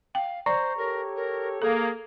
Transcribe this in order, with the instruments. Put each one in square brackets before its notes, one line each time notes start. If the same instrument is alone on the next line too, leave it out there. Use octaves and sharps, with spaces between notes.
[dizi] F5 [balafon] G5
[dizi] C5 [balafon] D5 [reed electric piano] A#5 C#6
[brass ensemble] G4 A4 C#5 [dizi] A#4
[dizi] A#4
[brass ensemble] A#3 [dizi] G#4 [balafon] A4